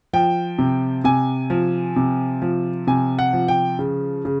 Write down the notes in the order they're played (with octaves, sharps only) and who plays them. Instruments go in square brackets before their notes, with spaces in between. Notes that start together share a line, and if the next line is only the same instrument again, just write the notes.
[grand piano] F3 G5
C3
C3 G#5
F3
C3
F3
C3 G#5
F#5
F3
G5
C#3
C#3